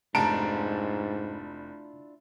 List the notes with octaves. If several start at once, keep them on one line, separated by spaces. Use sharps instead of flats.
F1 G#2 D4 E4 F4 A5 A#5 D7